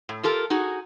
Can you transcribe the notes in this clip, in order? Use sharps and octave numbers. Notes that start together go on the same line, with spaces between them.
A2
F4 G4 A4 A#4
D#4 F#4 G#4